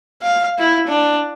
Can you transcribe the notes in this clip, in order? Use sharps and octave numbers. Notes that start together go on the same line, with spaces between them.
F5
E4
D4